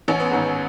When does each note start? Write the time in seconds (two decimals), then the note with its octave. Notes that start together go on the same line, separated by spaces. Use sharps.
0.08 A1 C#4
0.20 B3
0.31 G#2 D#3 C#4